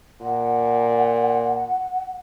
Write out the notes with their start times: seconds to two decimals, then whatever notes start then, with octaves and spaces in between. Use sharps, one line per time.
0.21 A#2 F#5